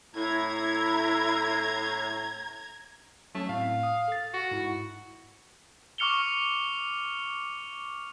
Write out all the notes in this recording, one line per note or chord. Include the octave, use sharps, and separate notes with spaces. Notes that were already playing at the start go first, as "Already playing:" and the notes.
A2 E4 A#5 G#6
F#3 A3 C#4 C#5
A2 C4 F5
D#6
A4 A6
F#4
G#2 E4
C#6 D6 F6 C#7 F7 G7